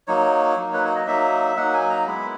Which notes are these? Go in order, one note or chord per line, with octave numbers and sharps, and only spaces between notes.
F#3 A#3 D#4 C#5
F#3 A#3 D#4
B4
C#5
D#5
F#3 A#3 D#4 E5
F#3 A#3 D#4 F#5
G#5
A#5
G#3 B3 E4 B5